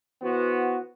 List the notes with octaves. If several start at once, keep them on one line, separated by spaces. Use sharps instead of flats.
E3 B3 F#4 C5